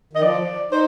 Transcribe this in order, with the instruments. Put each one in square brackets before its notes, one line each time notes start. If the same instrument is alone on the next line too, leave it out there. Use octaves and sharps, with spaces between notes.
[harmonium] D#3 [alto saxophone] D#5
[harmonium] F3 [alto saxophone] D5
[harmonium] D#4 [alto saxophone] C5